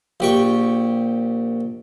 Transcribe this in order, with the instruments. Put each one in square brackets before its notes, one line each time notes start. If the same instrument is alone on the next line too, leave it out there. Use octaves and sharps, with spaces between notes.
[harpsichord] A#1 G4 C#6